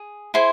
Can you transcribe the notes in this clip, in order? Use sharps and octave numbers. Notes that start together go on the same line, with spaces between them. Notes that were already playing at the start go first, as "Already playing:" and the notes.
Already playing: G#4
E4 G#4 C5 C6